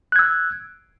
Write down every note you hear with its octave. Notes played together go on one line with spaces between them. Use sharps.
E6 F#6 G#6